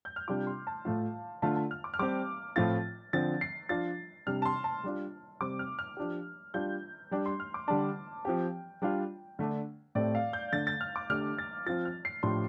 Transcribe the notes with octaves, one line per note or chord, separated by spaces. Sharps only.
G6
F6
C3 G3 D4 F4 D6
C6
A5
A2 A3 F4 F5
D3 A3 F4 A5
A5
F6
D6
F6
G3 C4 G4 D6
A2 F3 A3 C4 F4 A6
D3 F3 C4 A6
C7
F3 D4 F4 A6
C3 G3 D4 F6
A5
C6
A5
G3 D4 F4
C3 G3 C4 G4 D6
F6
F6
F3 D4 G4
G3 D4 F4 G6
G3 D4 G4
C6
F6
D6
D3 G3 D4 A5
F3 C4 G4 G5
G3 D4 F4
D3 A3 D4
A2 A3 C4 G4 D5
F5
G6
D3 A3 D4 A6
A6
F6
D6
D3 A3 D4 G4 F6
A6
F3 C4 F4 A6
F6
C7
A2 F3 D4 G4 C6